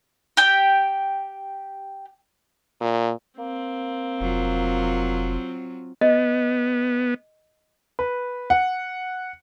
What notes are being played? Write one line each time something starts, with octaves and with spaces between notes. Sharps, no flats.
G4 G5
A#2
A#3 C4
F1 F#3 F4
B3 D#5
B4
F#5